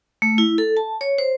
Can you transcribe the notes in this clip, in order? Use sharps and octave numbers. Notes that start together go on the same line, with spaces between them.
A3
E4
A4
A5
C#5
C5